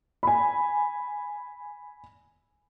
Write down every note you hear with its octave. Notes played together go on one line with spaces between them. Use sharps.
G#5 B5